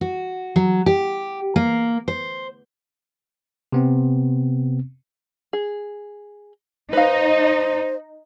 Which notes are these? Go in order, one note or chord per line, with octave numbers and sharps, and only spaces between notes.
F#4
F#3
G4
A#3
C5
C3 B3 C4
G#4
D#4 B4 C5 F5